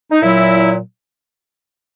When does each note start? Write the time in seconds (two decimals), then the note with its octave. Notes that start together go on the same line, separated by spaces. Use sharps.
0.11 D#4
0.21 A#2 F#3 E4